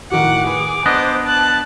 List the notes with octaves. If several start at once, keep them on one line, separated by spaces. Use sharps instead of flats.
A2 D#3 F#4 F#5 D6
G#4 B4
B3 D4 C5 D#5
A5 F#6